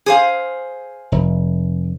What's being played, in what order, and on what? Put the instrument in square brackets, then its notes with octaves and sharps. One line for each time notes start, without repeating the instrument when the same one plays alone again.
[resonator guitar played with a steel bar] G#4 C5 F5
[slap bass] F1